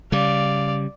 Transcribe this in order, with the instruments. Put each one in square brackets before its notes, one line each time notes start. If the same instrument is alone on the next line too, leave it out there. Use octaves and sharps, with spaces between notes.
[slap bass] C#3 G3 [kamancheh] D5 F5